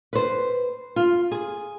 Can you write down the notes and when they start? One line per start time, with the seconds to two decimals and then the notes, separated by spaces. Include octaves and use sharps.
0.13 B4 C5
0.96 F4
1.31 G#4